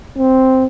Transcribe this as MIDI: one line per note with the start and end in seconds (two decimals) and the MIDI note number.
0.17 0.66 60